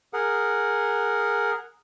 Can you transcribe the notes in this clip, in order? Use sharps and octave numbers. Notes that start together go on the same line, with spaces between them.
G#4 A#4 F#5